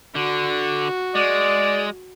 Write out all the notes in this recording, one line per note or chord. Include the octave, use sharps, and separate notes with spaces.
D3 F#4
G#3 D5